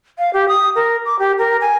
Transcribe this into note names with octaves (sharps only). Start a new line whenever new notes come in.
F5
G4
D#6
A#4
D6
G4
A#4
G#5